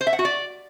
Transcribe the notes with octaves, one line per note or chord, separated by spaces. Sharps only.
C5
E5
F#5
F#4
D5